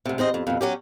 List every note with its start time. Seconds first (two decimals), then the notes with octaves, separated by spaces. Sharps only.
0.05 D2 C3
0.18 E2 C4 C5 D#5
0.34 F2
0.47 F2 B2
0.61 F#3 C#4 G4